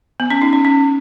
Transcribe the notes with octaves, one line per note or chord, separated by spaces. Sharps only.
B3
C#4
D#4
C#4
C#4